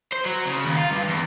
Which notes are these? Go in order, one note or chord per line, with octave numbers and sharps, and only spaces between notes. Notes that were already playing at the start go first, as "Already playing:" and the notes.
C5
F#3
C#3
D#2
F4
G2
E2